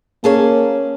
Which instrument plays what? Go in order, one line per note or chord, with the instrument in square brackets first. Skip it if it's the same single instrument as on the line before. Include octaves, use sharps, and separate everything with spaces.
[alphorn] A#3 [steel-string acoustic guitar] C#4 G#4 A5